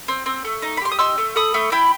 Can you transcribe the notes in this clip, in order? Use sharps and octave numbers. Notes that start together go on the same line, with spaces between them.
C4
C4
A3
D#4
B5
G4 C6
D#6
D#4 C6 E6
A3
A4 B5 D#6
A3
E4 G5 B5